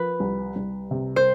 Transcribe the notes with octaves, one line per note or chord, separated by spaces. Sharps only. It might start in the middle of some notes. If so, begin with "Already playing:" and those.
Already playing: F3 B4
C2
C2
C3
C5